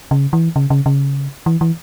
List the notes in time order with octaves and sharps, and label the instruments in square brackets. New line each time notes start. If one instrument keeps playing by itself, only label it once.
[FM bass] C#3
E3
C#3
C#3
C#3
E3
E3